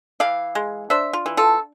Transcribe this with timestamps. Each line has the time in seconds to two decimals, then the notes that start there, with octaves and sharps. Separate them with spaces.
0.20 E3 D5 F5
0.55 G#3
0.90 D4 C5 E5
1.13 F4
1.26 E3
1.37 F4 A4